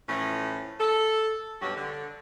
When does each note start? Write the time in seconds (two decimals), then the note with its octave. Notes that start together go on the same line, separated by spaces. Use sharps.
0.08 A2 E3 F3 A3 C#4
0.79 A4
1.62 G2 B2 F#3 C#4 F#4 G4
1.75 D3